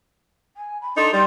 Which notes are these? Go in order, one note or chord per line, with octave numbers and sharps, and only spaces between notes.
G#5
B5
D4 D#4 A4 C6
G3 C6